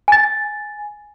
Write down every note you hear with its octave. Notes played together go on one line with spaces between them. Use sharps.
G#5 A6